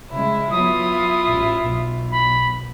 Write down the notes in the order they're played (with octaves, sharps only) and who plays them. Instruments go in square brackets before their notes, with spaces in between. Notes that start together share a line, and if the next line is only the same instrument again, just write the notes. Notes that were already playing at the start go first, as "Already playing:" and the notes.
[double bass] C#3 G#3 [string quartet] E4
[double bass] F#3 B3 [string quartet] E4 F4 [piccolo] D#6
[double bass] A1
B1
[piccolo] B5